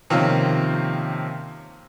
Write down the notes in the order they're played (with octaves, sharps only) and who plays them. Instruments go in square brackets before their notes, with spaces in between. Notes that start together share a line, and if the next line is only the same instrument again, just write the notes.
[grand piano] C3 D#3 F3 A#3 C#4